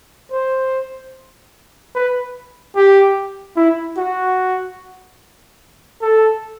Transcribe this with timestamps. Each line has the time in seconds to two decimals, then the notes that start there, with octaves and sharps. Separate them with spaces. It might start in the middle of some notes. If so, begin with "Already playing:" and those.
0.32 C5
1.95 B4
2.76 G4
3.57 E4
3.98 F#4
6.02 A4